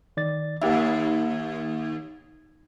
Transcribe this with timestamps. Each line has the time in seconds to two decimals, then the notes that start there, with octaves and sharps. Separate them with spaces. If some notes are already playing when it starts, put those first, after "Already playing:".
0.17 D#3 D5 A6
0.62 D#2 A#3 G4 E5